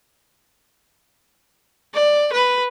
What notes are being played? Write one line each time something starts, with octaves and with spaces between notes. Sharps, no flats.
D5
B4